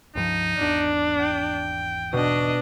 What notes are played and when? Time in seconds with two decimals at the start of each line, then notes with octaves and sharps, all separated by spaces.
0.15 C#2 G2 F3 D#4
0.58 G#1 E2 D4
1.20 G5
2.13 B2 D4 D#5